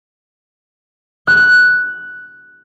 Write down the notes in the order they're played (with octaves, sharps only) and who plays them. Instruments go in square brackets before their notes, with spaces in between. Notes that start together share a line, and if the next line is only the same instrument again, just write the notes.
[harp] F#6